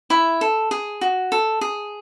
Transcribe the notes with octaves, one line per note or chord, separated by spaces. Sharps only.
E4 E5
A4
G#4
F#4
A4
G#4